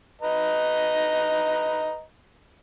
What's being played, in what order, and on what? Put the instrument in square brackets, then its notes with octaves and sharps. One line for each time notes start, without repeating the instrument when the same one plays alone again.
[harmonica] B4 D#5 A#5